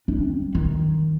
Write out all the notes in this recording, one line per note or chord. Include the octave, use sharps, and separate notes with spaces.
D4
G3
D#3